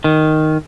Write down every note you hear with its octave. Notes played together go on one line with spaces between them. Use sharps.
D#3